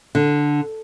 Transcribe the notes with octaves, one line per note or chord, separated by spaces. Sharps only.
D3